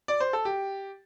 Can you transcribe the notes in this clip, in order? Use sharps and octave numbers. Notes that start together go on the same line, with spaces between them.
D5
C5
A4
G4